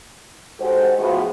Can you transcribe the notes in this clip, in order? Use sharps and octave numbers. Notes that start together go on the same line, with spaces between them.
G#2 F#4 G4 A4 C5
A2 F3 B3 F4 F#4 G#4